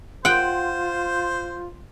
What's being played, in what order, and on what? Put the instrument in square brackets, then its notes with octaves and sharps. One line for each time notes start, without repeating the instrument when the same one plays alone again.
[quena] F4 [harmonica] C5 [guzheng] F#5 G5